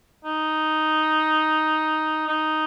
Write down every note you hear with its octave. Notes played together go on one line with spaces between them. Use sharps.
D#4
D#4